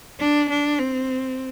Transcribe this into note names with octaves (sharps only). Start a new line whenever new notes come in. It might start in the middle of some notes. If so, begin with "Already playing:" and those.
D4
D4
C4